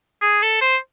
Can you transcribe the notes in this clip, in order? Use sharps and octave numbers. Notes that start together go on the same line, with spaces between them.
G#4
A4
C5